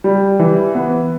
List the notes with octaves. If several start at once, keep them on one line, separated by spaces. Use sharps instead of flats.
G3
E3
B3